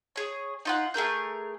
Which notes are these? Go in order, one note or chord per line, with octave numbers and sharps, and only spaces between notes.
G#4 C#5
D#4 F4 F#5
A3 G#4 A#4 G6